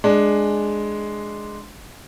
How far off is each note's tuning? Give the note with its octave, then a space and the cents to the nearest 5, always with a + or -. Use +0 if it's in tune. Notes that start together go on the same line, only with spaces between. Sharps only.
G#3 +5 D4 +10